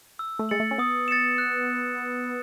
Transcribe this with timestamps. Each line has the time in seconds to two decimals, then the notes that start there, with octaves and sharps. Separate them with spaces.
0.19 E6
0.39 A3
0.49 G#3 A6 C#7 F#7
0.60 A3
0.71 C#4
0.78 B3 D#6
1.08 A6 C#7 E7
1.38 F#6